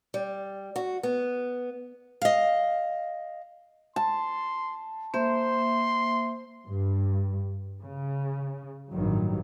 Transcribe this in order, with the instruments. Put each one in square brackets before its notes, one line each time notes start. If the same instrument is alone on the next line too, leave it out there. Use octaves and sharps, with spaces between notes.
[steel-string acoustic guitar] G3
F#4
B3
D#5 F5
[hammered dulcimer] A5 [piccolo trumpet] C6
[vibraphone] A#3 E5 [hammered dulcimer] C5 [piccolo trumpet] C6
[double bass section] G2
C#3
A1 G2 D#3 F#3